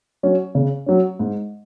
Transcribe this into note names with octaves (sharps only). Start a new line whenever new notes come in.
F#3 C#4
C#3
F#3 C#4
G#2